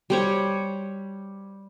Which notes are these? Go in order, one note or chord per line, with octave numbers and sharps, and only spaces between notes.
G3 C5 C#5